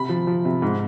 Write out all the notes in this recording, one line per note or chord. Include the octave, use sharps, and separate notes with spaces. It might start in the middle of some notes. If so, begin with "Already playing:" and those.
Already playing: C3 B5
F3
F3
C3
G#2